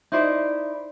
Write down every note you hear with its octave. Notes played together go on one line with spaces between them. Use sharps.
D#4 E4 C5 D5